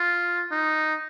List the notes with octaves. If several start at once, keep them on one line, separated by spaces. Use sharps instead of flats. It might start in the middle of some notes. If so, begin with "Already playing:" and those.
Already playing: F4
D#4